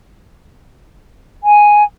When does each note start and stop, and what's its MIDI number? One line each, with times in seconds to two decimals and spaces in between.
1.44 1.84 80